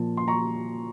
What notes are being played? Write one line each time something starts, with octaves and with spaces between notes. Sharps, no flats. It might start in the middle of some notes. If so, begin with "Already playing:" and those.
Already playing: A#2 F3 A5
C6
A#5 C#6